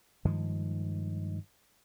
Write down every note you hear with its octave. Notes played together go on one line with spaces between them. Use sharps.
G2 D#3 F3 G#3